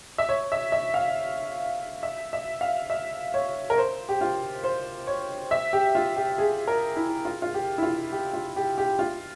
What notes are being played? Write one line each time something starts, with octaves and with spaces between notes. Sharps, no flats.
E5
C#5
E5
E5
F5
E5
E5
F5
E5
C#5
A#4
C5
G4
F4
C5
C#5
E5
G4
F4
G4
G#4
A#4
E4
F4
F4
G4
E4
F4
G4
F4
G4
G4
F4